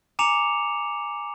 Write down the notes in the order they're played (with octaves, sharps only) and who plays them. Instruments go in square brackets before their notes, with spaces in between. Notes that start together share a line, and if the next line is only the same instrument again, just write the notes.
[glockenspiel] G#5 A#5 D6 C#7 E7 F7